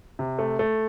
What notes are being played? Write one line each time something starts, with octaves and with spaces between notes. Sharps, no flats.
C3
A3
A3